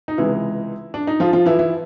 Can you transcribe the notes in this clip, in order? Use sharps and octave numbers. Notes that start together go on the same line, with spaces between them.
D#4
C#2 C3 E3 G#3 E4
D4
D#4
F3 F4
F3 F4
E3 E4
E3 E4